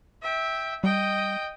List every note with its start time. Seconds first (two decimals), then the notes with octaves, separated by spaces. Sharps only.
0.22 E5 G5
0.84 G3 D#5 G5